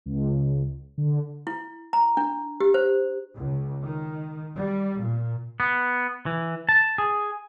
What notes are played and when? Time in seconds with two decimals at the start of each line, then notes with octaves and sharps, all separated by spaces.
0.06 C#2
0.98 D3
1.47 E4
1.93 A#5
2.17 D4
2.60 G4
2.74 C5
3.35 C#2
3.83 D#3
4.57 G3
5.00 A#2
5.60 B3
6.26 E3
6.69 A5
6.98 G#4